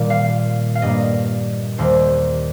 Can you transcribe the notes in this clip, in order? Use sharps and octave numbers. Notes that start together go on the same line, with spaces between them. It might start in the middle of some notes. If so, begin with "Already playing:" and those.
Already playing: A#2 D#3 G3 A#3
F5
F5
G2 G3 A#3 D#5
D#2 D#3 G3 A#3 C5